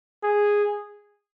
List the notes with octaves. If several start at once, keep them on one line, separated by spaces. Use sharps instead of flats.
G#4